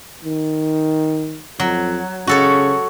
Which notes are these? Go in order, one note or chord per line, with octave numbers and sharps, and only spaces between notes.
D#3
F2 F#3
C#3 F#4 A4 C#5